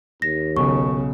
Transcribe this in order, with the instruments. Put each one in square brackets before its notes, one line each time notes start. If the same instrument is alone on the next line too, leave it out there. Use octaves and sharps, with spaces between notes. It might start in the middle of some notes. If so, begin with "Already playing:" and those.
[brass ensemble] D#2 [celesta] A#6
[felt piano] B1 [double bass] C#3 [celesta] C#6